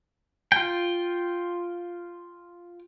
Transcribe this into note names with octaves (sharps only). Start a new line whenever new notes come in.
F4 G5